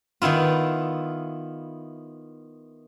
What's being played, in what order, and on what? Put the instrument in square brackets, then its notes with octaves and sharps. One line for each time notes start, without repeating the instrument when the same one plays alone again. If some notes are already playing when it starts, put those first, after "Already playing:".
[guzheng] D#3 B3 E4 F4